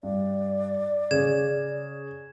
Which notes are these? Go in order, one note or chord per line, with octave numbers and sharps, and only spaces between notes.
G2 D5
C#3 G#6 E7